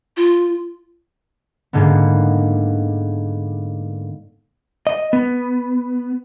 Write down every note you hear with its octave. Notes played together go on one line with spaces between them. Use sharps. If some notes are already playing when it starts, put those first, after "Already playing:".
F4
G#2 D3 A#3 B3
D#5
B3